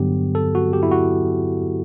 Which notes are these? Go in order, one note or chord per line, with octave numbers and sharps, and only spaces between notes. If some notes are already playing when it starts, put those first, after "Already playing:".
Already playing: G2 D3 F#3 B3 G4
A4
F#4
G4
E4
F#4